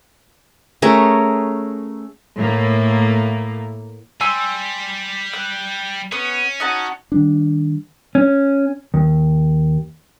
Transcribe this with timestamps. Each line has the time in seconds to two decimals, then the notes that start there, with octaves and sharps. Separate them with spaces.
0.82 A3 C#4 G#4 A#4
2.37 A2 A#3
4.21 G3 G#5 C6 E6
5.33 F#6
6.12 B3 C#4
6.60 D#4 F#4 A5
7.12 D#3 G3 D4
8.15 C#4
8.94 D#2